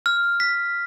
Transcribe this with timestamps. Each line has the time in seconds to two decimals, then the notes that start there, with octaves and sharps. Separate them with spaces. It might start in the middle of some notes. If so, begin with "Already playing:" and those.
0.06 F6
0.40 B6